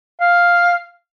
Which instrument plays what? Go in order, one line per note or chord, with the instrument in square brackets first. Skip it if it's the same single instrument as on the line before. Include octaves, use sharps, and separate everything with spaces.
[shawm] F5